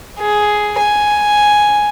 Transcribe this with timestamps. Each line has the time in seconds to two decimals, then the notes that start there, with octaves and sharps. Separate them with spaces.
0.19 G#4
0.79 G#5